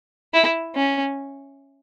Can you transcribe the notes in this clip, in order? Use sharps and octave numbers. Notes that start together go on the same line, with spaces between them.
E4
C#4